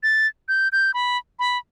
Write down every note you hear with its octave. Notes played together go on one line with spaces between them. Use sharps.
A6
G6
G6
B5
B5